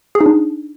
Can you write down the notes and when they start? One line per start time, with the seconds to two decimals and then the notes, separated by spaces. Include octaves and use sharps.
0.15 G#4
0.21 D#4
0.26 D4